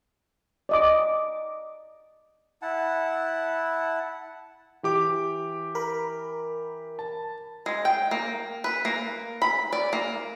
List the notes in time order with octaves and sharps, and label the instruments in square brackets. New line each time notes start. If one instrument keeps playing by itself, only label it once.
[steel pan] D5 D#5 D6
[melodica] E4 F#5 A5
[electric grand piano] E3 G4 D6
[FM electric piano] A#4 B5
[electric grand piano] A5
[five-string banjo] G#3
G5
A#3
B4
A#3
B5
D5
A#3